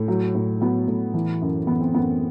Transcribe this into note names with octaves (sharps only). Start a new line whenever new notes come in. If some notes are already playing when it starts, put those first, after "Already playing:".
Already playing: A2
F#3
A2
F#3 B3
A2
E3
F#2
E3 B3
C4
F#2 B3